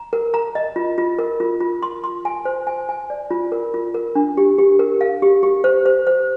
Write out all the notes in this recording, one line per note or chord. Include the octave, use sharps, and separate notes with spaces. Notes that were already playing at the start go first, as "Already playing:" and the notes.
Already playing: A#5
A#4
A#5
D#5
F4
F4
A#4
F4
F4
C6
C6
G#5
C5
G#5
G#5
D5
F4
A#4
F4
A#4
D4
G4
G4
A#4
F5
G4
G4
C5
C5
C5